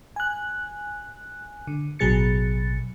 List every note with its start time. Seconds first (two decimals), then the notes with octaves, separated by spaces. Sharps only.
0.16 G#5 F#6
1.67 D3
1.99 A1 B2 F#3 G#4 A6 C#7